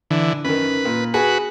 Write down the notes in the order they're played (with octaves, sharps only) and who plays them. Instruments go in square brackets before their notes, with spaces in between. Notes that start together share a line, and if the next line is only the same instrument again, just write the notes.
[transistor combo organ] D3 E3
[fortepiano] F#2 D#3 [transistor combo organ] B4
[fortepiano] A#2
[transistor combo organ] F#4 B4 [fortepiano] G#4